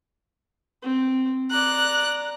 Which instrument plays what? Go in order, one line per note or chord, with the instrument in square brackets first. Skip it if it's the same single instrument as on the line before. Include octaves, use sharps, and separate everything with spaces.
[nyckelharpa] C4
[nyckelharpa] D5 A#5 [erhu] F#6